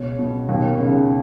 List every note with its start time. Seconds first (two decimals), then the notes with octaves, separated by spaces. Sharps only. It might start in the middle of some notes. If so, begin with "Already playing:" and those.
Already playing: C#2 B2 C#5
0.19 B2
0.49 D#2
0.80 C#3